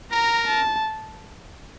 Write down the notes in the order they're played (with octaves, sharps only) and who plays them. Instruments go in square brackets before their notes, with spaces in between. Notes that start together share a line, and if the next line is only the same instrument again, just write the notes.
[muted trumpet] A#4 [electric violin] A#5
[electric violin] A5